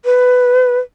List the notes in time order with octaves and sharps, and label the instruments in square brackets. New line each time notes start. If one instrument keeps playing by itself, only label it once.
[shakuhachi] B4